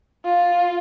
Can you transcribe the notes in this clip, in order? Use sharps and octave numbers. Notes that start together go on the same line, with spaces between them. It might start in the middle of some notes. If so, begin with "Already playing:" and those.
F4